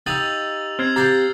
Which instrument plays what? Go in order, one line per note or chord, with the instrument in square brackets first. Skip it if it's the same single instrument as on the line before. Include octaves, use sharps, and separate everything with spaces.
[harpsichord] D#4 G4 F5 [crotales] E6 F7 F#7 [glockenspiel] A6 D#7
[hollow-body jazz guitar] C4 [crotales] F6 G#6 C7
[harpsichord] G4 F5 G5 [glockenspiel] A#5 C7 G7 [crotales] A6